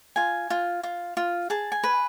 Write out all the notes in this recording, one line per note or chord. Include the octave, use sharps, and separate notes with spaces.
F4 G#5
F4
F4
F4
G#4 A5
G#5
B4